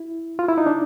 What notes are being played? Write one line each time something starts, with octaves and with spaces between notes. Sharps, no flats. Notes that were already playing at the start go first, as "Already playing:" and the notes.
Already playing: E4
F4
E4
D#4
D4